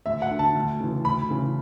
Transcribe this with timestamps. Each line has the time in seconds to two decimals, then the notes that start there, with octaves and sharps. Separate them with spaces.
0.06 D2 E5
0.22 F#5
0.31 D3
0.39 A5
0.55 D2
0.80 C#3 E3
1.05 D2 B5
1.30 C#3 E3